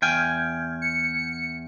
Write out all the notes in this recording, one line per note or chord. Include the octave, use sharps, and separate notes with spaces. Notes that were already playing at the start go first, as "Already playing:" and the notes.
E2 G5 G#5 F6 G6 G#6
C#7